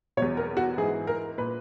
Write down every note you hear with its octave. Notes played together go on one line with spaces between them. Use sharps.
E2 B2 C#5
A#4
F#4
G#2 E3 G#4
A#4
A#2 B4